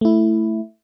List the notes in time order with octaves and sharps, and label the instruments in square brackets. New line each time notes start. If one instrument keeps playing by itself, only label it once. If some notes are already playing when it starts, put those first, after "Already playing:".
[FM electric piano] A3 E4